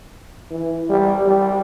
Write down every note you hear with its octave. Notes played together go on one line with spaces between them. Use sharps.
E3
G3
G3